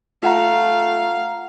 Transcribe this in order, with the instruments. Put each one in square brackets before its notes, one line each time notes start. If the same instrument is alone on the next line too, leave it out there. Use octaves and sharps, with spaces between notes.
[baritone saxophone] A3 [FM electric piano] F4 F#5 A#5 [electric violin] F5